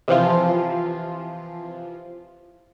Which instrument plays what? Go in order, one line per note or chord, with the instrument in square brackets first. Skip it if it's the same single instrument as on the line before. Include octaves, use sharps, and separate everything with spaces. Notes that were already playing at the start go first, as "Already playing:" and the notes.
[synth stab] C3 E3 F3 F4